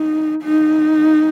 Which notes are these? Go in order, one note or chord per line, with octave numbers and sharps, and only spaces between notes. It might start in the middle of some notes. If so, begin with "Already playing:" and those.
Already playing: D#4
D#4